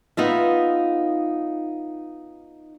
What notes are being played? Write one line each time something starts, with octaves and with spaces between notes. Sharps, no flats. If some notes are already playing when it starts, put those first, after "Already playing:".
B3 D#4 F4 E5